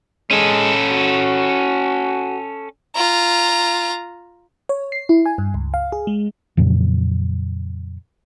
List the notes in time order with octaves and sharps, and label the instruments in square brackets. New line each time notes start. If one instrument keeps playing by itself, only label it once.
[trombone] G#3 [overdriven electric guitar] C#4 A4
[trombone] F#4
[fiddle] F4 A#5
[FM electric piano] C#5
C7
E4
G#5
G2
C#2
F5
G#4
G#3
[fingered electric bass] F2 A#2 C#3 F#3